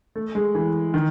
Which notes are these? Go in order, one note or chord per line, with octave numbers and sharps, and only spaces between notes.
A3
G#3
E3
D#3